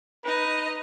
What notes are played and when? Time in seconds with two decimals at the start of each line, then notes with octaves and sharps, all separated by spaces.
0.25 D#4 B4 D#5